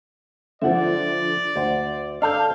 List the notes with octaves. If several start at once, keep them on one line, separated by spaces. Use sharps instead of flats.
D3 F3 D5 E5 F#5
D2 C5
D4 A4 F5 F6 G6